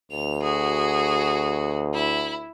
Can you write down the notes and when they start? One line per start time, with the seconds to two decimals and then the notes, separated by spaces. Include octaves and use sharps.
0.12 D2 F7
0.42 F#4 G#4
1.94 E4